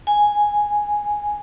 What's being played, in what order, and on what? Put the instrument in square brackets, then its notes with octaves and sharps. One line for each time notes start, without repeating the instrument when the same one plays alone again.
[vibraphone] G#5